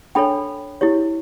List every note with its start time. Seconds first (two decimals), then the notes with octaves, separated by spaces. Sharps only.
0.15 D4 A4 C#5 G5 B5
0.81 E4 G4 C#5